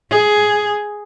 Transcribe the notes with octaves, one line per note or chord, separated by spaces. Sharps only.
G#4